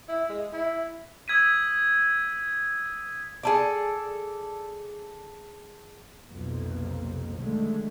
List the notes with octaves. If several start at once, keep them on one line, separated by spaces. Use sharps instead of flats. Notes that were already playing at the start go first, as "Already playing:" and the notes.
E4
G#3
E4
D#6 E6 G#6 B6 D#7
G#4 A4 D5
B1 F2 C3 A#3
D3 D#3 F#3 G#3 A3